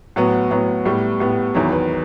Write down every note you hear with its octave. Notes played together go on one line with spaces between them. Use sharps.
A2 F#3 B3 F#4
A2 F#3 B3
A2 G3 B3
A2 G3 B3
E2 D#3 F#3 E4
B4